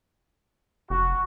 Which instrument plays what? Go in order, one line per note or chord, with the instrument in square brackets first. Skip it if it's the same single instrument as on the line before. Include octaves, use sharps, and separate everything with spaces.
[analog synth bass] F1 [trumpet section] F#4